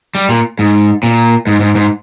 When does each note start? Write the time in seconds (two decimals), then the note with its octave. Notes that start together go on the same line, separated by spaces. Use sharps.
0.15 G3
0.29 A#2
0.59 G#2
1.03 A#2
1.47 G#2
1.60 G#2
1.75 G#2